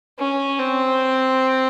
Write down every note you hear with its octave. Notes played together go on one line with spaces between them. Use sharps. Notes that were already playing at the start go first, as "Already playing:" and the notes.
C#4
C4